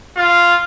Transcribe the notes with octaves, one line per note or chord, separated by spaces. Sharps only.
F4